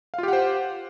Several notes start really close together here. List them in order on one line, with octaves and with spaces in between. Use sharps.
F5 F4 G4 F#5 C5